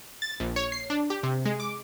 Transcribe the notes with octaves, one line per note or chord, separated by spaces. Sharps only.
A6
A#1
C#5
C7
D4
G4
C3
G#3
D6